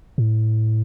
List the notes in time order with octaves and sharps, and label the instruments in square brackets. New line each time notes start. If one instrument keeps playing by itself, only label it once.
[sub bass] A2